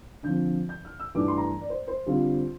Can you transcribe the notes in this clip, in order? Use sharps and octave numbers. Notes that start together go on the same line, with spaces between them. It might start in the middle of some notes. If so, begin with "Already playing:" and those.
D3 F3 C4 G6
G6
F6
E6
G2 E3 A3 D4 D6
C6
A#5
D5
C5
C5
D3 G3 C4 F4